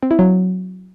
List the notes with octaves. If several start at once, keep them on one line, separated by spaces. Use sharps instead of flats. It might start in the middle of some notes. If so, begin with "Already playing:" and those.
C4
E4
F#3